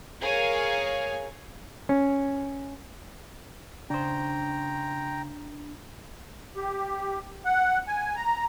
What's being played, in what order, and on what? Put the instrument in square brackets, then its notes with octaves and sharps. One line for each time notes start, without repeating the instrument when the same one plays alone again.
[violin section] G#4 A#4 C#5 F5 G#5
[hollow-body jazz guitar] C#4
[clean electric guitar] C#3 C5 [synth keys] D4 [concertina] G5 A#5
[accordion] G4
F#5
G#5
A#5